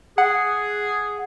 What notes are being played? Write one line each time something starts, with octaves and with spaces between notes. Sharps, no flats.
G#4 F#5